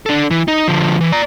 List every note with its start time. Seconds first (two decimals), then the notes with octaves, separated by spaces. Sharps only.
0.06 D4 A4
0.31 E3
0.48 D#4
0.68 D3 F3
1.01 E3
1.12 D5 A#5